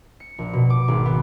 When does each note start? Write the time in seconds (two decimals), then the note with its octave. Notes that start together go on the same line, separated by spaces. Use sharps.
0.20 C#7
0.38 A#1
0.53 B2
0.70 D6
0.88 G#1
1.06 B3